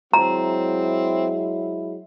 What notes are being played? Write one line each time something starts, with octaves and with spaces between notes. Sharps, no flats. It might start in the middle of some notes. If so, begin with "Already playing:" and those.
F#3 G#3 C4 E4 A#5